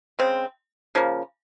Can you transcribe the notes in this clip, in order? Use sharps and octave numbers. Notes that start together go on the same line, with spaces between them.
C#3 G#3 C4
C#3 F3 A#3